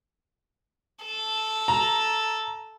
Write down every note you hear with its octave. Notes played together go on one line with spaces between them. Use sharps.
A4
A#5